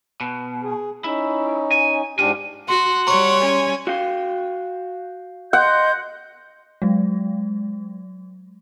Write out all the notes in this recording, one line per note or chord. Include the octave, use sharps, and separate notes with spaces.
B2
G#4
C#4 D#4 E4
G#5
G#2 D4 F4 G4 G#5
F#4 F#5 C6
G3 C#5 A#5 C#6
C#4 G#5
F#4 F5 G5
D#5 F#5 C6 G6
F#3 G#3